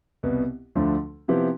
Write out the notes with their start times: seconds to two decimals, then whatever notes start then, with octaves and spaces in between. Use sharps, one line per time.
0.23 C2 B2 B3
0.75 D2 D3 F3 A3 D4
1.28 C3 F3 B3 E4 G4